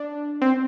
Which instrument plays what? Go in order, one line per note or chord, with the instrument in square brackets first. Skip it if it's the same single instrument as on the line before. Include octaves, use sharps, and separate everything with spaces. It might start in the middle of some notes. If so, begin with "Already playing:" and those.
Already playing: [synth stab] D4
C4